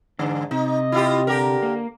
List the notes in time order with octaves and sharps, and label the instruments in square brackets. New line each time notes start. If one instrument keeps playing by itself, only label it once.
[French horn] G#2 [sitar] D3 [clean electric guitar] D4
[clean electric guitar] C3 [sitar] D#4 [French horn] D#5
[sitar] E4 F4 G4
[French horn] D3 [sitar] G4 A#4
[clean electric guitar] A#3